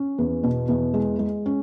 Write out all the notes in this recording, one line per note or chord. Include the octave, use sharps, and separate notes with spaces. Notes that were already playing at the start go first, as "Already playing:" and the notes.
Already playing: C#4
E2
B2
E2
G#3
G#3
C#4